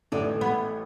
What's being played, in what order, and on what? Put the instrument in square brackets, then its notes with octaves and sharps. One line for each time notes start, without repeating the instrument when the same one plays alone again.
[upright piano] A1 A2 E3 A3 [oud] D3
[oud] B3